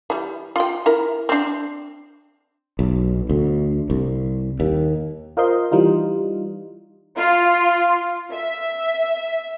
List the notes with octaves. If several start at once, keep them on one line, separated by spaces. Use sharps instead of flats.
E3 G3
F4 G5
E4 A#4
C4 D4
B1
D2
C2
D#2
F4 A#4 C5 D#5 C6
E3 G3 D#4 F4
F4
E5